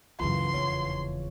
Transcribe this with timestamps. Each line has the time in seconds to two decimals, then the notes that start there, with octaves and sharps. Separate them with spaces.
0.20 C#2 F#2 C#3 E3 F4 C6
0.54 F1 E2 C#5